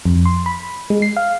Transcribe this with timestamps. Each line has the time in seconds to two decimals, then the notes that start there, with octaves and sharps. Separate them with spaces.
0.05 F2
0.25 C6
0.46 B5
0.90 G#3
1.02 C7
1.17 F5